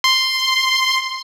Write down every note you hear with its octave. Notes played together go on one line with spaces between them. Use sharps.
C6